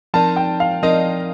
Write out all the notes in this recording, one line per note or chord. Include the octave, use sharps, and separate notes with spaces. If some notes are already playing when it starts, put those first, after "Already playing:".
F3 C4 D#4 A#4 D5 A5
G5
F5
F3 C4 D#4 A#4 D5 D#5